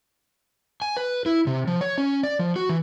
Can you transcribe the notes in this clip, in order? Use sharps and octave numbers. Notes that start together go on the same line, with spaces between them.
G#5
B4
E4
C3
F3
C#5
C#4
D5
F3
F#4
E3